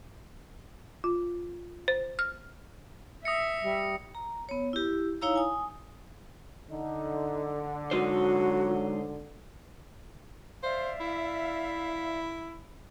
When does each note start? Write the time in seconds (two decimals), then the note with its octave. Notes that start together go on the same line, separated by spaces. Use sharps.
1.04 F4
1.88 C5
2.19 F6
3.25 E5 D#6 A#6 C#7
3.62 G3
4.15 A#5
4.49 B3 C#5
4.73 E4 G4
5.21 D#4 E4 C#5 F5 A#5 E6
5.36 G#5 D#6
6.71 D3 D#4
7.91 F#3 G#3 D#4 F#4 C5
10.63 C5 D5 E5 F5
11.01 E4